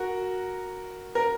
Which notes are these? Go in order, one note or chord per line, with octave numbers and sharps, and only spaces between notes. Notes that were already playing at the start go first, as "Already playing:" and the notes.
Already playing: F#4 A#4
A#4